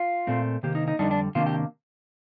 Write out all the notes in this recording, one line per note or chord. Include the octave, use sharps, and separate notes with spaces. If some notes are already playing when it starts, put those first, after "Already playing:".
Already playing: F4
A#2 A3 C4
C3 D#3 A#3 G4
D#4
D#4
F2 D3 G3 D4 D#4
D4
C3 D#3 A#3 D4 F4
G4